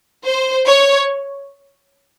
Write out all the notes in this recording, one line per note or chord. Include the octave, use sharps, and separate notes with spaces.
C5
C#5